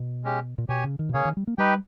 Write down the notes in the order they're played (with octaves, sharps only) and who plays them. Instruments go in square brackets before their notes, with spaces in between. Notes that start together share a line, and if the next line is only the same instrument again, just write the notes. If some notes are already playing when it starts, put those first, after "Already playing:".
Already playing: [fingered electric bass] B2
[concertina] G#3 C#4 G4
[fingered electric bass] A#2
[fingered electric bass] B2 [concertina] G4 C#5 G#5
[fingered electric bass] C#3
D#3
B2
[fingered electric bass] C#3 [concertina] A#3 C#4 G#4 C#5
[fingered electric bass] D#3
G3
A#3
[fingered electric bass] G3 [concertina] D#4 G4 B4 G5